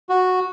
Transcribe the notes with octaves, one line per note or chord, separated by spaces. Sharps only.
F#4